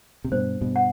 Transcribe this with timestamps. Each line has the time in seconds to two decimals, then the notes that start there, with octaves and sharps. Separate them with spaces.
0.24 C3
0.32 G2 B2 C5
0.61 G2 B2
0.76 F#5